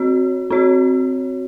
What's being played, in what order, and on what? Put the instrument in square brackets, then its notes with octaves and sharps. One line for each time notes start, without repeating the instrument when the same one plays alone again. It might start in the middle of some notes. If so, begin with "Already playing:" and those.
Already playing: [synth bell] C4 F#4 C#5
C4 F#4 C#5